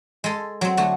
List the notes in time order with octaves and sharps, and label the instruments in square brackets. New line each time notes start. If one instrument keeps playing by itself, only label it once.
[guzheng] G#3 A4
F#3 C4
D3 A3 F#4